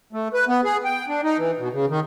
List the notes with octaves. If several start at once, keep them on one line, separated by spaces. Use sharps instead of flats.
A3
B4
B3
G#4
G5
D4
D#4
E3
B2
C#3
D#3